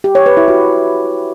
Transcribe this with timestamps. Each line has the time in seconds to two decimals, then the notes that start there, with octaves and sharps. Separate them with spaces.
0.04 G4
0.15 C#5
0.26 B4
0.37 E4
0.48 F#4